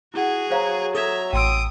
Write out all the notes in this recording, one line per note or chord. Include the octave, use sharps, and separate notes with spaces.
E4 F#4 G#4 F#5
F#3 C5 F5 A#5
A4 E5 A#5 D#6 G#6
A1 G5 C6 D#6 E6 D7